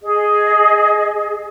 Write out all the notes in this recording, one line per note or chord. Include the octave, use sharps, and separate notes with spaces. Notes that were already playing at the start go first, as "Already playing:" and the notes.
G#4 D#5